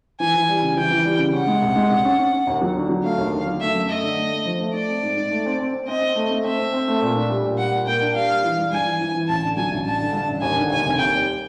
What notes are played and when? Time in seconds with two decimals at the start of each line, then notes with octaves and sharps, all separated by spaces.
0.20 E3 G#5
0.34 E3
0.48 G3
0.63 C#3
0.77 E3 G5
0.90 E3
1.05 G3
1.19 C#3
1.33 C#4 F#5
1.47 G#3
1.62 C2
1.76 G#3
1.90 C2
2.05 C#4
2.19 C#4
2.33 C#4
2.47 D#2
2.62 F#3
2.75 D3
2.89 F#3
3.04 A3 F5
3.18 D#2
3.32 D3
3.46 F#3
3.61 A3 E5
3.75 F#2
3.89 A3 D#5
4.03 D3
4.17 A3
4.32 A3
4.46 F3
4.60 A3
4.73 A3 D5
4.89 C4
5.03 G#2
5.17 G#2
5.31 A3
5.46 C4
5.59 C4
5.74 C4
5.88 C4 D#5
6.01 C4
6.15 A3
6.31 A3
6.44 C4 E5
6.58 C4
6.73 C4
6.88 A3
7.02 A#2
7.15 D4
7.30 G3
7.44 A#2
7.58 G3 F#5
7.72 A#2
7.86 A#3 G5
8.01 D4
8.14 G3 F5
8.29 G3
8.44 E3
8.58 G2
8.72 G2 G#5
8.85 E3
9.01 E3
9.14 E3
9.28 A1 A5
9.43 D3
9.57 F#3 G#5
9.71 A1
9.85 G2 A5
10.00 D3
10.13 G2
10.28 A1
10.42 D#2 G#5
10.56 D3
10.70 D#2 G#5
10.85 F1
10.98 D#2 G5
11.13 G3